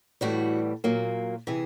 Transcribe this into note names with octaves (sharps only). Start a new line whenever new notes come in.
A2 E3 G3 F#4
A#2 F#3 A#3
C3 E3 G#4